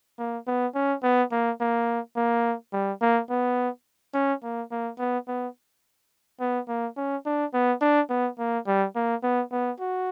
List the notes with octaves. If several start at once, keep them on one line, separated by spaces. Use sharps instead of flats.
A#3
B3
C#4
B3
A#3
A#3
A#3
G3
A#3
B3
C#4
A#3
A#3
B3
B3
B3
A#3
C#4
D4
B3
D4
B3
A#3
G3
A#3
B3
B3
F#4